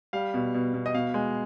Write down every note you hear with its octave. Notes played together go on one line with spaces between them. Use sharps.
G3 F5
B2
B2
B2
D#5
B2 F5
G#3